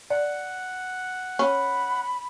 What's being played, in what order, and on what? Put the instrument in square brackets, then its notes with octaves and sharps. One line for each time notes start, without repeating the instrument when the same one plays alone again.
[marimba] D5 [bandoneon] F#5
[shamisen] C#4 [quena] B5